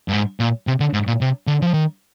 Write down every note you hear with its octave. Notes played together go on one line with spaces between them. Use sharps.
G2
G#2
A#2
C3
D3
G#2
A#2
C3
D3
F3
D#3